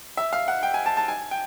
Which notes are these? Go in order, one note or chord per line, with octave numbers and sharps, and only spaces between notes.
E5
F5
F#5
G5
G#5
A5
A5
G#5
G5